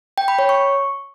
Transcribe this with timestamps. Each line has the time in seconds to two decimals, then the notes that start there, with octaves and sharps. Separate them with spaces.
0.18 G5
0.28 B5
0.39 C#5
0.49 C#6